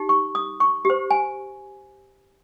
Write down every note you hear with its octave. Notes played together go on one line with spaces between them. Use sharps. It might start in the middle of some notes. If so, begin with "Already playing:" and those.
Already playing: D#4 G4
C#6
D#6
C#6
G4 C5
G#5